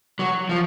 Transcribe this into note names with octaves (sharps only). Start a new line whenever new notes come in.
F#3
F3